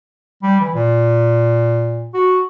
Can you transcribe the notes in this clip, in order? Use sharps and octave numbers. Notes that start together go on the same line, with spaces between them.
G3
E3
A#2
F#4